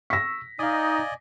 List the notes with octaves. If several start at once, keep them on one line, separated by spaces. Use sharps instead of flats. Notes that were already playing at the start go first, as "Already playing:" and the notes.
C#6 E6 A#6 B6
D#4 D5 D#5 F5 G#5 D#6